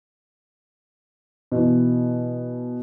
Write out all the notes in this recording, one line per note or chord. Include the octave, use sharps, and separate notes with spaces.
B2 E3